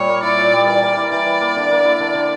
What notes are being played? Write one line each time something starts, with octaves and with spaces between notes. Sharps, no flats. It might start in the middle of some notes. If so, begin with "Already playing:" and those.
Already playing: A#2 G3 C#5
A#3
E4 D5
A#2
G3
E3 D5
A#3
E4
E3 D5
E3
A#3
D3
A#3
E4
D3
D3